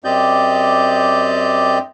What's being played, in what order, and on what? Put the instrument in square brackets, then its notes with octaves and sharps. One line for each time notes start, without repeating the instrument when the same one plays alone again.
[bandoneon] F#2 C4 G4 D5 D#5 G6